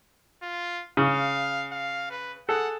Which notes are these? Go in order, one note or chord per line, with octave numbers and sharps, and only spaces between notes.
F4
C#3 F5
F5
B4
G#4 A4 F#5